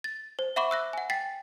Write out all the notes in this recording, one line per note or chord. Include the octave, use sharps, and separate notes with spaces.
A6
C5
E5 F#5 B5 C#6 D6
E6 F#6 A#6
F#5 G#5
G5 A6 B6 C7